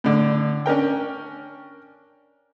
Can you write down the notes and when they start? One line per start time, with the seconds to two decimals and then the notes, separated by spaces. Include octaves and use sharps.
0.04 A2 D3
0.66 C#4 D4 A#4 G5